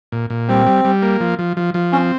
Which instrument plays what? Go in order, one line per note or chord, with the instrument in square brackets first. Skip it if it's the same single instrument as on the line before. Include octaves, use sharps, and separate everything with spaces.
[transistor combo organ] A#2
A#2
[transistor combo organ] G3 [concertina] C4
[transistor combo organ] G3
G3
A#3
F3
F3
F3
F3
[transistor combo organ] C4 [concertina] C#4